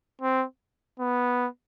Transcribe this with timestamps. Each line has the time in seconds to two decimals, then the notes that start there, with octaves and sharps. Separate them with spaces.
0.21 C4
1.00 B3